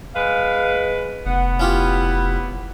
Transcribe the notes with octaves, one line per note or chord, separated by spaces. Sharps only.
G#3 B4 F5
F1 B3 F#5
C#4 E4 F4 G4